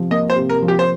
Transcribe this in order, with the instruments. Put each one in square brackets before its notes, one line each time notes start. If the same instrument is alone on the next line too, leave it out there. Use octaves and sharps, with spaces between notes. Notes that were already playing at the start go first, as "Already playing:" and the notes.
Already playing: [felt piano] C3 F3
[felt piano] A#3 [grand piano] D#5
[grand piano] C5
[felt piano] C3
[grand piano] A#4
[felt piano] F3
[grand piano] G4
C5